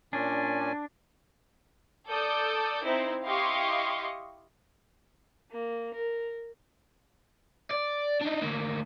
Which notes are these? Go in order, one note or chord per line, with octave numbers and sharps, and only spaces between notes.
A#2 C#4 D4 G#5
A4 D5 D#6 G6
C4 D#4 E4 C5
E4 G4 D#5 F5 C6 C#6
A#3
A#4
D5
D4 D#4
D2 A#3